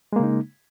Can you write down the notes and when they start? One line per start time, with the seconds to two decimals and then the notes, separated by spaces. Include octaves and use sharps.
0.13 G#3
0.16 A#3
0.20 C#3
0.23 D#4